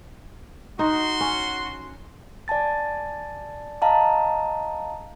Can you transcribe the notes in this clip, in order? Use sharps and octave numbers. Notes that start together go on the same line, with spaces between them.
D#4 F#4 C6
C#4
D5 G#5 A5 A6
D#5 F5 A5 A#5